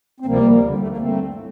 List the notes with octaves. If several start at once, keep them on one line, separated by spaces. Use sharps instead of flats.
C4
D2 C3 F3 G3 A#3
D#2 D3 G3
A3
A#3
G2 D3 G3 A3 C4
A2